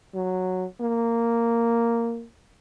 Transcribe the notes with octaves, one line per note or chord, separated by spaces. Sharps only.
F#3
A#3